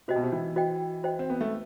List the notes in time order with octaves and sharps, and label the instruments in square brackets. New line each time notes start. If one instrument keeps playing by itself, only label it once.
[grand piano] C3 [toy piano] F#4 C5 D#5 G5
[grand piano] B2
C3
E3
[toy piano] F#4 C5 D#5 G5
F#4 C5 D#5 G5
[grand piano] C4
B3
A3